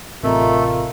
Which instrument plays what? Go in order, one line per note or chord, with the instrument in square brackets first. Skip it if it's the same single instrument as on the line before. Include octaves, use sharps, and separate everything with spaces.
[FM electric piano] A1 C3 [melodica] A3 [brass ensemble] F4 [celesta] A#4 D#5 A#5